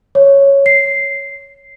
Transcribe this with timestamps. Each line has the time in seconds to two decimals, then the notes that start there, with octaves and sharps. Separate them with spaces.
0.15 C#5
0.66 C7